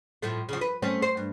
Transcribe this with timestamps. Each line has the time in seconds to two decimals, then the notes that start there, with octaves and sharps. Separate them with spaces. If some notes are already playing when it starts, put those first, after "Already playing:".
0.22 A2 F3 A3
0.49 C#3 F3
0.61 B4
0.82 A3 C4 C#4
1.02 C5
1.17 G2